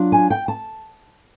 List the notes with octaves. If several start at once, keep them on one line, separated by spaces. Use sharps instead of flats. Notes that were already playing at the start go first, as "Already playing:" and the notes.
Already playing: F#3 D4 F4
G#5
G5
A5